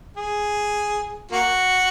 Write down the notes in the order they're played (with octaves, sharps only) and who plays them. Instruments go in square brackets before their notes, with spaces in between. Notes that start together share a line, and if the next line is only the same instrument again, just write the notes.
[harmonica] G#4
A#3 F#4